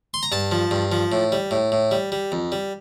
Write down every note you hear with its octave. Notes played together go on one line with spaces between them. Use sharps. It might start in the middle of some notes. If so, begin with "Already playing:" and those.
C6
A#5
G2 A5
F3
G2
F3
A2
G3
A2
A2
G3
G3
F2
G3